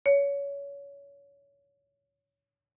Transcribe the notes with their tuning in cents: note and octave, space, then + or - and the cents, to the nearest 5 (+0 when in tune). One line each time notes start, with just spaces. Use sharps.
C#5 +25